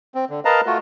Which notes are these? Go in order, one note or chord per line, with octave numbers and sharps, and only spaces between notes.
C4
D3
A#4 B4 D#5 F5 A5 A#5
A3 F4 F#4